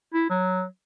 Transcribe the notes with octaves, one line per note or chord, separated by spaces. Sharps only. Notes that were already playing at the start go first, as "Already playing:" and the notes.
E4
F#3